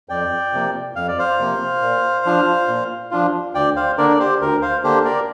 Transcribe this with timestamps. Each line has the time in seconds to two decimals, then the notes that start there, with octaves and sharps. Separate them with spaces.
0.09 F2 D5 G5
0.53 C3 F3 A#3
0.96 F2 F5
1.08 D5
1.19 C5 F5
1.39 C3 F3 A#3
1.82 A#2
2.26 F3 D4 F4
2.68 A#2
3.11 F3 D4 F4
3.55 D2 D5 G5
3.76 C5 F5
3.98 D3 A#3 D4 A#4 D5
4.10 D5
4.19 G4 C5
4.41 D2 A#4
4.62 C5 F5
4.84 D3 A#3 D4 G4 C5
5.05 A#4 D5